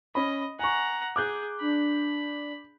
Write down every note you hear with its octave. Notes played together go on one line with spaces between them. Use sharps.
C#4 D#5 B5
F#5 G#5 A#5 C#6
G#4 D6 F#6 G6
D4 B5